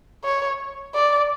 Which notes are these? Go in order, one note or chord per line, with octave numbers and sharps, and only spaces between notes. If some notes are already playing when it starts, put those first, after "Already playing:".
C#5
D5